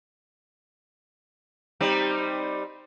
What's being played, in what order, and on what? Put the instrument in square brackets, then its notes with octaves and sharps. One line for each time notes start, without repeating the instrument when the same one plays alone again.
[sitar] G3 C4 D#4